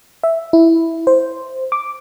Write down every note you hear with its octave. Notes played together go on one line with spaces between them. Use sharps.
E5
E4
C5
D6